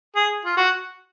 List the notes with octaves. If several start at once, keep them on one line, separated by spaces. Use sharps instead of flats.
G#4
F4
F#4